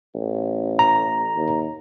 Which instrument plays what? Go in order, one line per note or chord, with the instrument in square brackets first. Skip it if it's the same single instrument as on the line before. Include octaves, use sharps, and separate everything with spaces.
[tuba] A1
[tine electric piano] A#5
[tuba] D#2